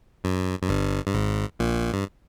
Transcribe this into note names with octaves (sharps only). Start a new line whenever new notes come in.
F#2
F#2
G1 G2
G2
G#1 G#2
A#1 A#2
G2